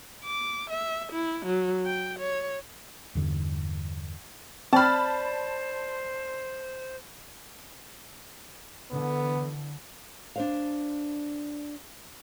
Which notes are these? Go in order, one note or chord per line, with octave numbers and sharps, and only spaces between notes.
D6
E5
E4
F#3
G5
C#5
E2 G2 D3
C4 C5 D5 A5 B5 F6
D3 E3 B3
D4 C5 F5